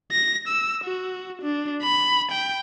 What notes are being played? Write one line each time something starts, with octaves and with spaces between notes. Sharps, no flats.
A#6
E6
F#4
D4
B5
G5